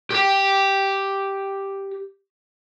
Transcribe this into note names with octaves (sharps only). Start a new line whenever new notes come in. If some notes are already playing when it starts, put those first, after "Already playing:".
G4 G5